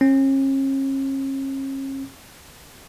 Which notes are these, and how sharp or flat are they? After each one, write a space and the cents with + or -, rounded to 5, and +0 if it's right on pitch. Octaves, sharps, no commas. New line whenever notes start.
C#4 -40